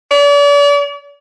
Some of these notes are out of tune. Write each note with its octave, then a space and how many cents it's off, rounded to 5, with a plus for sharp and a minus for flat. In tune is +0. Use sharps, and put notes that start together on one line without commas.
D5 -40